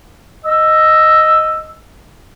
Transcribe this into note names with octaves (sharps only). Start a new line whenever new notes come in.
D#5 E6